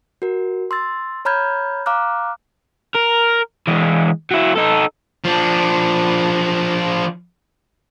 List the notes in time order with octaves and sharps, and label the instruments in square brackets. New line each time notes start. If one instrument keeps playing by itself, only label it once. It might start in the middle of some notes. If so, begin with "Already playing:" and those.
[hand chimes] F#4 A#4
C6 E6 A6
C#5 A#5 B5 F6 G6 G#6
F5 A#5 D6 F6 F#6
[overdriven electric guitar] A#4
E3 G#3
F#3 E4
D#4 A4
[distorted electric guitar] F3 D4